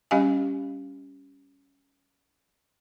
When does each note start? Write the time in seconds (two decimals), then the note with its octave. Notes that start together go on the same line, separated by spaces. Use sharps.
0.11 G3 C#4 G4 D#5 F5 G#5